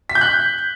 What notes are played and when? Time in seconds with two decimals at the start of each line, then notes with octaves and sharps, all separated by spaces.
0.09 B6
0.15 G6
0.21 F#6